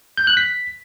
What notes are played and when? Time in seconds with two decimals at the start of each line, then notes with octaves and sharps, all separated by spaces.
0.17 G6
0.27 F#6
0.37 B6